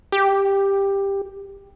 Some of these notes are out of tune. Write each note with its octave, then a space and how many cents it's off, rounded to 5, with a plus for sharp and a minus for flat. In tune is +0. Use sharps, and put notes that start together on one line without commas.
G4 +10